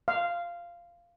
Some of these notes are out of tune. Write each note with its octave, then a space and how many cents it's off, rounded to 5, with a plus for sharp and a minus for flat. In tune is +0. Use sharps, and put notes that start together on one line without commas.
F5 -10